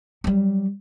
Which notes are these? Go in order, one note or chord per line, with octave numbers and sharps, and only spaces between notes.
F#3 G3